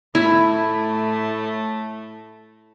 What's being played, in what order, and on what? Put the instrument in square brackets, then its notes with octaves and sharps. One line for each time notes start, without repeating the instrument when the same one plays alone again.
[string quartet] A2 A3 [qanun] E4